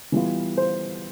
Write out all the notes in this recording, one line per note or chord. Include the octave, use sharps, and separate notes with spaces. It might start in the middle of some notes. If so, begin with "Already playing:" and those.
E3 G3 B3 F4
C5